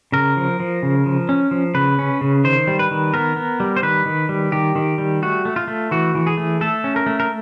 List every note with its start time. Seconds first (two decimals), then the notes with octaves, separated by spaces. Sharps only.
0.12 C#3 A#4
0.37 F3
0.60 F3
0.83 C#3
1.06 F3
1.29 C#4
1.51 F3
1.74 C#3 B4
1.99 C#4
2.21 C#3
2.44 D#3 C5
2.67 G3
2.79 B4
2.91 D#3
3.14 B3 A#4
3.36 B3
3.60 G3
3.77 C5
3.82 D#3 B4
4.06 D#3
4.29 G3
4.52 D#3 G4
4.75 D#3
4.98 G3
5.22 A3 F#4
5.45 A3
5.56 F4
5.68 A3
5.91 E3 F#4
6.15 E3
6.27 G#4
6.37 A3
6.61 A3 A4
6.84 C#4
6.96 A#4
7.06 A3
7.20 A#4